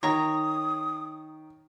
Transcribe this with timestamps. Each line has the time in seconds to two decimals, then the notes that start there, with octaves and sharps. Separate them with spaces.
0.03 D#3 C#5 A#5 D#6